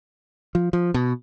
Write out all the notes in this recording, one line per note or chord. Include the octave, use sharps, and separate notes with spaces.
F3
F3
B2